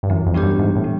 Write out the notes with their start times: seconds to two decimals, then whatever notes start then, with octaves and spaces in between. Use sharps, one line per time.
0.03 G2
0.10 F#2 E3
0.26 F2
0.34 G3 B3 D4 G4
0.43 F#2
0.59 G#2 E3
0.76 A2
0.84 G3